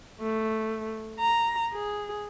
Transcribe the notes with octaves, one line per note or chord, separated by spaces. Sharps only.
A3
A#5
G#4